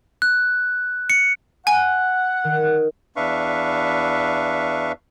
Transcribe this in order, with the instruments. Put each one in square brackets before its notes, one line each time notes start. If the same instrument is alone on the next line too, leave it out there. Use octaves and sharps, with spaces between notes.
[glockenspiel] F#6
C#7
[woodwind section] F#5 [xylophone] G#5
[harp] D#3
[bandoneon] E2 D4 B4 E5 F5 C#6